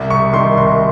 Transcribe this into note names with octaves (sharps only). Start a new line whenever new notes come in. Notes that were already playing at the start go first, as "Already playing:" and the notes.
Already playing: C2
C2 C#6
D#3 C6
C2 C6